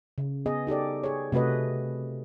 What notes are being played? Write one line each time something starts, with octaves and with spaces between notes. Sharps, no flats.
C#3
B3 G#4 D#5
D#4 G4 A4 D5
G#4 C#5
C3 A3 F#4 B4 D#5